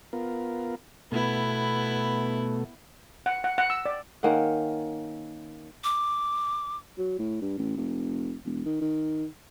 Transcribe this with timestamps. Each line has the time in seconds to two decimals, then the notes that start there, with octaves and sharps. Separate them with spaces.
0.13 B3 F4 A#4
1.12 B2 A3 B3 E4
3.26 F#5
3.44 F#5
3.58 F#5
3.70 E6
3.86 D5
4.23 D#3 A#3 C#4 F#5
5.84 D6
6.98 F#3
7.19 A2
7.41 G2
7.58 A1
7.77 F1
8.46 E1
8.66 D#3
8.81 D#3